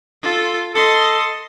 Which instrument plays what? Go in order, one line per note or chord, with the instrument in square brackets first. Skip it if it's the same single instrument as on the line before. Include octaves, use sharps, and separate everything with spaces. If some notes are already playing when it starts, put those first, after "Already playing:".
[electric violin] F4 A4
[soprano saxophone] A4 [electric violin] D#5 C6